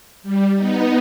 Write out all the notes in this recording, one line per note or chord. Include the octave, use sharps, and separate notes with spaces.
G3
B3 D#4